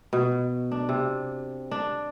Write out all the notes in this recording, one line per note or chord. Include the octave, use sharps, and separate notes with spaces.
B2
D4
C3
D4